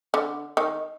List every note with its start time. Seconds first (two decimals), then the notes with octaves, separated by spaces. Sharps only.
0.14 D3
0.57 D#3